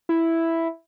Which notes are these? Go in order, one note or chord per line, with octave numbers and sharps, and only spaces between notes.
E4